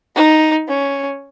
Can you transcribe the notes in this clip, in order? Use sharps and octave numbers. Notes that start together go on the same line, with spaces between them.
D#4
C#4